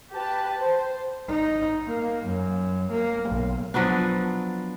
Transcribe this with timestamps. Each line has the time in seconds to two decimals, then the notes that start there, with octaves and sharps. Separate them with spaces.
0.13 G4 B4 A5
0.59 C5
1.28 D#4
1.87 A#3
2.24 F#2
2.90 A#3
3.28 B1
3.74 F3 F#3 B3 D4